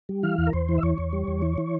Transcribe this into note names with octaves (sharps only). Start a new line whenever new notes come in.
G3
E3 F5
E2
A#4
E2 C5
E3
E5
E2 C#5
E2
G3
E2
E3
E3